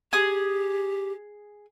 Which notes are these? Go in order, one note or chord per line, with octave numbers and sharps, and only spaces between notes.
G4 G#4 D#6